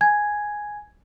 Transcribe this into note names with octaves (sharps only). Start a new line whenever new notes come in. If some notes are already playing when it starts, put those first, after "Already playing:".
G#5 G#6